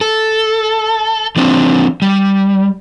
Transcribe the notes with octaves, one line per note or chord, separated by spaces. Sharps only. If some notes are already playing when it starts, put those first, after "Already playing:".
A4
F3 C4 D4
G3